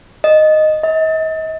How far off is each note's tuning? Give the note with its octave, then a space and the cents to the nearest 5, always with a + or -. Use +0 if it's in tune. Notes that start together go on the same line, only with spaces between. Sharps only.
D#5 -5
D#5 +40